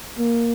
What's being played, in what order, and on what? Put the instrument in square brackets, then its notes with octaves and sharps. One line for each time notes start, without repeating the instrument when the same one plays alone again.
[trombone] A#3